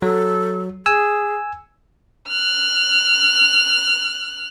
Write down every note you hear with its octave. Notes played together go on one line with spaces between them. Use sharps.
F#3 A4
G#4 G#5 E6
F6 F#6